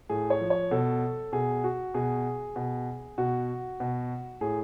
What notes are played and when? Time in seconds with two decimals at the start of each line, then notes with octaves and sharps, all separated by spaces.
0.09 A2 G#4
0.30 C#5
0.40 F3
0.50 C#5
0.71 B2 A4
1.32 B2 G#4
1.64 F#4
1.94 B2 G#4
2.56 B2
3.18 B2 F#4
3.80 B2
4.41 A2 G#4